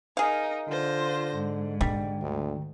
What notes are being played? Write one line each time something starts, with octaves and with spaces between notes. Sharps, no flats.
D#4 G#4 A#4 F5
D3 F4 C5 A#6
G#2
D3 G3
D2